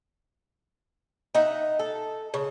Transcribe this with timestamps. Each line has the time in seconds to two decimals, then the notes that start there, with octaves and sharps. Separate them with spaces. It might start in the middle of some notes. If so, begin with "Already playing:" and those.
1.35 D#4 E5 F#5
1.79 A4
2.34 C#3